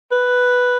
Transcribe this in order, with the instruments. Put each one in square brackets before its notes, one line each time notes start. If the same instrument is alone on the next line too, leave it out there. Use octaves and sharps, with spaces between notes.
[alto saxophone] B4